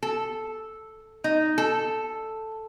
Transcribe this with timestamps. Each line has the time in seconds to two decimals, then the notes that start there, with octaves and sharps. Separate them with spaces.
0.03 A4
1.24 D#4
1.58 A4